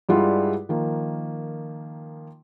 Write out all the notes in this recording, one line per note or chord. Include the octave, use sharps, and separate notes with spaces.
G2 G3 G#3 E4 F4 F#5
D#3 F3 A#3